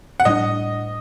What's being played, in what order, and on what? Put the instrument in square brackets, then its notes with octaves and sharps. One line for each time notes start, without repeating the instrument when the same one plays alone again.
[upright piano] F#5
[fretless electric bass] A2 G3 A#3 D4 [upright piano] D#5